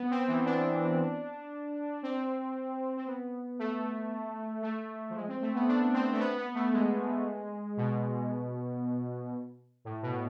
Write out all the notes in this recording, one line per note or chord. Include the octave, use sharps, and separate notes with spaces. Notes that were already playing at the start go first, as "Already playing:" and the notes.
Already playing: B3
C4
E3
D4
C4
C4
B3
A3
A3
F3
G#3
C4
A3
B3
D4
C4
A3
B3
B3
A3
G#3
B2
A2
B2